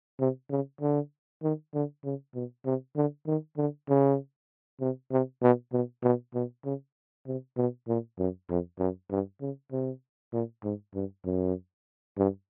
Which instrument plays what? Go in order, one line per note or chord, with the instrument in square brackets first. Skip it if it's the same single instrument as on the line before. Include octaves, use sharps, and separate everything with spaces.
[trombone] C3
C#3
D3
D#3
D3
C#3
B2
C3
D3
D#3
D3
C#3
C3
C3
B2
B2
B2
B2
C#3
C3
B2
A#2
F#2
F2
F#2
G2
C#3
C3
A#2
G#2
G2
F#2
G2